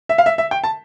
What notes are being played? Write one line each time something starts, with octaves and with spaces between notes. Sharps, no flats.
E5
F5
E5
E5
G5
A5